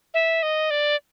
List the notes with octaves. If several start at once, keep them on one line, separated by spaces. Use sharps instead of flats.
E5
D#5
D5